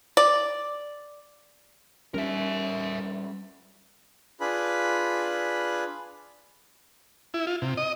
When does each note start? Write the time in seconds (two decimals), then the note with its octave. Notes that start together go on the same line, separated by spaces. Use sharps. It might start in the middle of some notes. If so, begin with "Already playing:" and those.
0.17 D5
2.14 G3 C#4 A#4 E5
4.40 D4 F4 G#4 B4 B5
7.34 E4
7.47 F4
7.62 C3
7.77 D#5